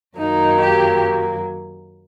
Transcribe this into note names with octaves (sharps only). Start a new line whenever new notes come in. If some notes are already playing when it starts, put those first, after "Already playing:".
F#2 D#3 F#3 A#3 D#4
G4